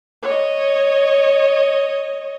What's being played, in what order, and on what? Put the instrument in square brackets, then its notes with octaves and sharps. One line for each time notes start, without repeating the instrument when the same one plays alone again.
[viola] C#5 D#5